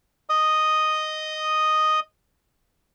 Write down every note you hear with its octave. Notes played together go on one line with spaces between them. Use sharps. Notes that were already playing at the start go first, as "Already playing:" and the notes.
D#5 D#6